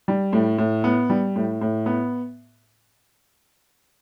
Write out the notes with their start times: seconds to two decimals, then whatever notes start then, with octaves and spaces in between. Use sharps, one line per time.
0.08 G3
0.33 A2
0.58 A2
0.84 B3
1.10 G3
1.36 A2
1.61 A2
1.86 B3